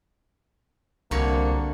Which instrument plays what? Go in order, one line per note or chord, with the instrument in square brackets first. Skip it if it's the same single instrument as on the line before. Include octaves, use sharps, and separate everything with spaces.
[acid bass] C2 [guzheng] D3 F#4 C#5 [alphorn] A#3